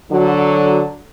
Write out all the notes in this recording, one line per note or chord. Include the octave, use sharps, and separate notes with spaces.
D3 F#3